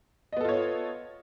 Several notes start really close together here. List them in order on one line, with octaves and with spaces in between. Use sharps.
D#5 B3 A4 F4 C#5